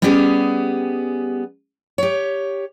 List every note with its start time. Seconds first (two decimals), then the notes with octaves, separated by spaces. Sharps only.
0.02 G3 B3 C#4 G4 G#4
1.98 G4 C#5